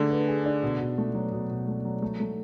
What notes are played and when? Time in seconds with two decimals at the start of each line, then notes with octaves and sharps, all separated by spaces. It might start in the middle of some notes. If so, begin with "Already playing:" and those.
Already playing: D3 A3 D4 G#4
0.11 B4
0.28 G#4
0.46 D4
0.63 B2
0.80 B2
0.98 A3
1.15 F#3
1.32 B2
1.50 B2
1.68 A3
1.85 F#3
2.02 A3
2.20 A3